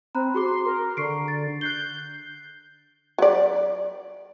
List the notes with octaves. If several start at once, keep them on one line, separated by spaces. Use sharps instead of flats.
C4 A#5 B5 F#6
F#4 G#4 C6 D6
A#4
D3 C#6 C7 D7
A6
F#6 G6 C7 G7
F#3 D5